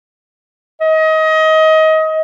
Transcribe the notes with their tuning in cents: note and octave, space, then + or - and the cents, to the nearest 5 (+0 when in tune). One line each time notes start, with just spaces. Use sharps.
D#5 +25